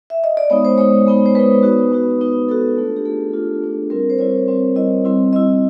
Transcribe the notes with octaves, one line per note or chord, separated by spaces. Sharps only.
E5
D#5
D5
G#3 B3 D#4 C#5
C5
G#3 B3 D#4 C#5
G#3 B3 D#4
C5
G#3 B3 D#4 B4
B3 D#4 F#4
B3 D#4 F#4
B3 D#4 F#4
B3 D#4 F#4 A4
A3 D4 F4
G4
A3 D4 F4 G#4
A3 D4 F4
A3 D4 F4
G3 C4 E4 A#4
C5
G3 C4 E4 C#5
G3 C4 E4
G3 C4 E4 D#5
G3 C4 E4
G3 C4 E4 D#5